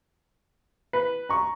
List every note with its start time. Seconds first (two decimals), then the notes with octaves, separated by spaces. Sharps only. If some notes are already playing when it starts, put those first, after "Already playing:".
0.93 B4
1.29 A#5 C#6